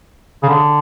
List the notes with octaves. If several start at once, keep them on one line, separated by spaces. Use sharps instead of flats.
C#3
D3